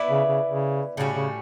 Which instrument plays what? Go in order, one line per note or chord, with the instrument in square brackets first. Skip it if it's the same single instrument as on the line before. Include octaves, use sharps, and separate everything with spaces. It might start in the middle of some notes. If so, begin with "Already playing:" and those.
Already playing: [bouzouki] B3 E4 B4 D5
[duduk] C#3
C#3
C#3
[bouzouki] A2 G3 C#4 F#4 [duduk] C#3
[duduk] C#3